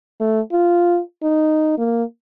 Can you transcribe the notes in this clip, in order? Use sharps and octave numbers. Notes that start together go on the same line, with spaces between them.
A3
F4
D#4
A#3